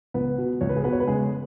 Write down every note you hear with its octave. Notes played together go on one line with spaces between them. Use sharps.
C#2 B3 B4
B2
C#2 C#5
B4
G#4
B2 B3 B4
C#5
B4
C#3 G#3 G#4